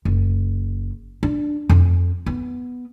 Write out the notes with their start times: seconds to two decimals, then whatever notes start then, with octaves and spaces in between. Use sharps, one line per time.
0.05 F#1
1.23 D4
1.69 F2
2.26 B3